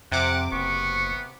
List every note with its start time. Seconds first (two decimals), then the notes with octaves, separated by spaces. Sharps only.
0.12 F2 C3 F#5 D6
0.52 F#1 B3 C#6